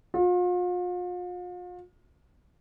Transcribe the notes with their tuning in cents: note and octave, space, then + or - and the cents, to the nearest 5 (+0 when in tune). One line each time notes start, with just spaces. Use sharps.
F4 +40